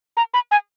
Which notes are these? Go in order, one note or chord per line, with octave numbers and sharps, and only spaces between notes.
A#5
B5
G#5